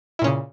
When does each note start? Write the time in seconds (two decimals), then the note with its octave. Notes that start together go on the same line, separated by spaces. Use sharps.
0.19 E4
0.22 A#2
0.24 C#4
0.27 C#3